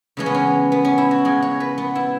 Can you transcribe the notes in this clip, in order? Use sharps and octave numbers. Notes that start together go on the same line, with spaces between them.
C#3 E3 G#3 C#4
B3
C#4
B3
C#4
E4
F#4
C#3 G#3 G#4
C#5
B4
B3
E4